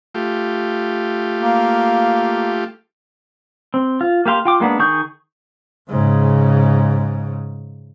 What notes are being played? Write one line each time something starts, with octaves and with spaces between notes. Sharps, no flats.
A3 F4 G4
A#3
C4
F4
A#3 G4 F5 C6
F4 G5 D6
G#3 A#3 B3 D4
D#3 G#4 C#6 D#6 G6
G#2 C#3